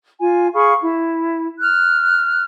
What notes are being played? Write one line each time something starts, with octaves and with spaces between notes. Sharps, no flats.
F4 G#5
G#4 F5 B5 C#6
E4
F6 F#6